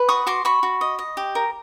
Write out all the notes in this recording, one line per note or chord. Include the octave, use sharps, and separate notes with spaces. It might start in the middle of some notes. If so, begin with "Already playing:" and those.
Already playing: B4
F#4 C#6 D#6
F#4 C6 D6
F#4 B5 C#6
F#4
D#5
D#5
G4
A#4